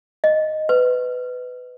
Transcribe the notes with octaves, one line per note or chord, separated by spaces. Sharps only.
D#5
B4